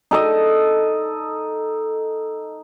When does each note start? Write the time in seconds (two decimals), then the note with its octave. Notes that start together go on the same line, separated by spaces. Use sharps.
0.11 D#4 A4 D#5